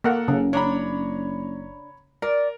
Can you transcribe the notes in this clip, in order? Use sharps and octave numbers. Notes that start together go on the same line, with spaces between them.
A#3 A4 A#4 F#5
F#1 C#3
D4 C#5 A#5 B5
A#4 D5